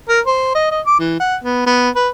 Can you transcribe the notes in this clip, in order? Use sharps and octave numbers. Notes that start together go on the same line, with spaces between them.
A#4
C5
D#5
D#5
D6
E3
F#5
B3
B3
B4